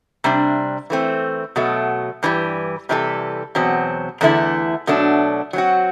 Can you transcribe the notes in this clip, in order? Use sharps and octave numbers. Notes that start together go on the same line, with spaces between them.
C3 G3 D4
E3 A3 C4
B2 F#3 A3
G2 E3 G3
C3 E3 G3 D4 A4
E2 B2 F#3 C4
E2 D3 A3 E4
B2 F#3 A3 D4
F#3 C4 F#4